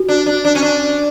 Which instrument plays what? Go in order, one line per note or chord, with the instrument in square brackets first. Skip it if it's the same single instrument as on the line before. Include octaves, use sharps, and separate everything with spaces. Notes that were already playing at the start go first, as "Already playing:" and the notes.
Already playing: [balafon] F#4
[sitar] D4
D4
D4
C#4
D4